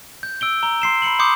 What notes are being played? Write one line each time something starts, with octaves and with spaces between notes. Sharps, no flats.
G6
E6 D7 G7
A#5 G7
C6 C7 E7
B5 C#7 F#7
B5 C6 D6 D#6 G6 C#7